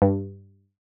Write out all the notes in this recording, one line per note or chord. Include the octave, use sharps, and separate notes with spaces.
G2